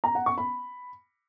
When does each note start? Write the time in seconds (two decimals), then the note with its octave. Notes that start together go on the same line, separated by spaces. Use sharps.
0.04 A#5
0.15 F#5
0.26 C#6
0.38 B5